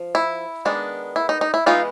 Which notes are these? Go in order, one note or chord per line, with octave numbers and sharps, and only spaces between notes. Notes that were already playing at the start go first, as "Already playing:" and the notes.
Already playing: F3
E4
D#3 G#3 B3 D4
E4
D#4
D#4
E4
E3 G#3 B3 D#4 F4